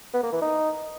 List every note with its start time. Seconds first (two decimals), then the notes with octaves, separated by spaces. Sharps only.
0.14 B3
0.23 A#3
0.32 E3
0.42 D#4